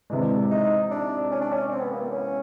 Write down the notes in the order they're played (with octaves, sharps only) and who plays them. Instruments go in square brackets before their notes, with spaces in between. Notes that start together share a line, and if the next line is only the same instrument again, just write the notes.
[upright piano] C3 E3 G#3 [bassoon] D4
[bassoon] D#4
D4
C#4
D4
C#4
C4
B3
A#3
B3
C#4